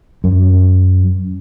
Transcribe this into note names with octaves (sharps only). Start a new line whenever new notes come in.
F#2